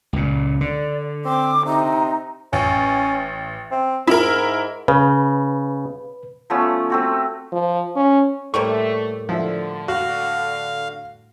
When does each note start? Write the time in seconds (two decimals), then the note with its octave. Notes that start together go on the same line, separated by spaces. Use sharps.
0.13 C#2 A#2
0.61 D3 D5
1.25 C4 D6
1.66 C3 D#4
2.53 A1 C#4
3.71 C4
4.07 G#2 E4 A#4
4.88 C#3 B4
6.50 F3 A3 B3 C#4
6.90 A3 C4 F#4
7.52 F3
7.96 C#4
8.54 A2 G3 A3 A#3 C5 C#6
9.29 D3 F3 E4 E5
9.88 F#4 F5